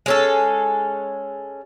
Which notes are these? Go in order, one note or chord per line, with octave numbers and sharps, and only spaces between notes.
G#3 C#4 A4